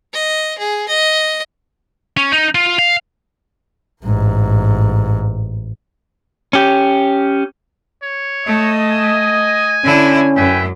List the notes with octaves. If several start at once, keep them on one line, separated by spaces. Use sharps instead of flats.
D#5
G#4
D#5
C#4
D#4
F4
F5
A1 G#2
C#4 G4
C#5
A3 D#5
G#5
D3 C#4 E4
F#2 B4 E5 G5 G#5